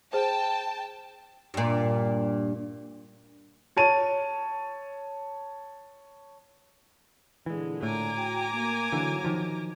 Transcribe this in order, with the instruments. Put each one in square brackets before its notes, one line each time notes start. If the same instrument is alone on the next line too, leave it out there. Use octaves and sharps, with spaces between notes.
[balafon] G#4 C5 [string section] G5 A5
[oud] G2 A#2
[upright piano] C#5 A5 D#7
[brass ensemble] A#2 D3 [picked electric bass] E3 [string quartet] G#3
[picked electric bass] A2 [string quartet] G#5 A#5 D6
[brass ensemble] F#4 G5
A#3
[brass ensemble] G#1 F#3 [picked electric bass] D3 E3
[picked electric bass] D#3 F3